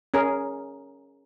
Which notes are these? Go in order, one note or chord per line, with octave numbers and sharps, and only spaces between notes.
C#4 G#4 A#4